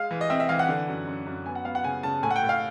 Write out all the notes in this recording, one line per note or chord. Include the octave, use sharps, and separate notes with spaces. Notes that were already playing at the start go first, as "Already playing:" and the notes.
Already playing: G#3 F5
E3
D#5
C4 E5
E5
E3 F5
F#5
D3
F#2
F#2
F#2
B3 G#5
F#5
B3 F5
F#5
C#3 G#5
C#3 A5
A2 G#5
F#5
G5
A2
F5